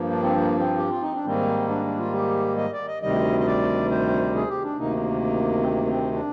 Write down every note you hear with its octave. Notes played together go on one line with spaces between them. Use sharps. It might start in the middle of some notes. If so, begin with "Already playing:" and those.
Already playing: G2 F3 A#3
D4
C4
A#3
C4
G4
F4
D#4
D4
G#2 D#3 G3 A#3 C4
D4
D4
F4
G4
D#5
D5
D#5
D2 C3 D#3 G3 D#5
D#5
D5
C5
G#4
G4
D4
D2 C3 D#3 A#3 D#4
C4
A#3
A#3
C4
D4